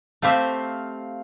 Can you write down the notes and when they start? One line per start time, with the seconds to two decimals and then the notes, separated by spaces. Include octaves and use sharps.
0.22 A3 C4 G4 C5 E5 F5